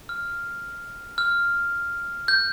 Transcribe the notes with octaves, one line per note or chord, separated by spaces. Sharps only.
F6
F6
G6